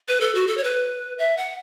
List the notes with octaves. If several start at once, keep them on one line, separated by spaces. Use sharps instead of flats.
B4
A4
F#4
A4
C#5
B4
E5
F#5